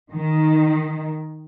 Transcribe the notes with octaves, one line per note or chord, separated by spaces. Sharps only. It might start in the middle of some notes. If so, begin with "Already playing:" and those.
D#3